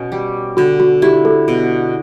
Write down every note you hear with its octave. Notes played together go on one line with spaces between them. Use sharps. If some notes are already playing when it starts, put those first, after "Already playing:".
Already playing: B2 C#4
G3
D3 F#4
F#4
E4 G4
A4
B2